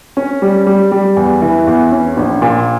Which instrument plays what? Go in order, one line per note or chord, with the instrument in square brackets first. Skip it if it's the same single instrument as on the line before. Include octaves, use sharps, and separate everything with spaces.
[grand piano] C#4
G3
G3
G3
E2
E3
E2
C#4
A#1
A#2